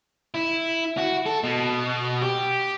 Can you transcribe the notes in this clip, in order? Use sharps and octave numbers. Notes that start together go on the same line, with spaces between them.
E4
F#4
A4
B2
G4